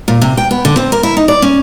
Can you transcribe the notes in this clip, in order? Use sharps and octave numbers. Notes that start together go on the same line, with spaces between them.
A#2
C3
G5
B3
D3
C4
A#4
E4
D#4
D5
C#4